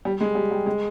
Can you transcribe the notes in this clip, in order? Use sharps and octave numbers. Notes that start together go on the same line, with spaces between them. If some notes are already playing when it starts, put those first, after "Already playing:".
G3
G#3
G3
G3
G#3